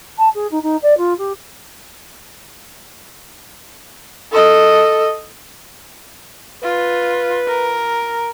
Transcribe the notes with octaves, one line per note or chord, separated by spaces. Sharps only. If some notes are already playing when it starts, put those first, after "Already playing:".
A5
G#4
D#4
D#4
D5
F4
G4
A4 D#5
F4 B4
A#4